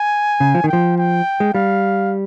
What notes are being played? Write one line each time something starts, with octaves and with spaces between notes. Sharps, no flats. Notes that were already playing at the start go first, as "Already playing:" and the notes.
Already playing: G#5
C#3
F3
D#3
F3 G5
G5
G#3
G3 F5